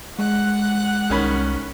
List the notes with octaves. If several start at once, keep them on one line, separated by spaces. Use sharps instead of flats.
G#3 F#5 F#6
C2 D#3 C#4 B5